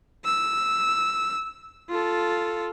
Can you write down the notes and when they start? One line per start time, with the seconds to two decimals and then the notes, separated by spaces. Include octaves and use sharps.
0.25 E6
1.89 F4 A4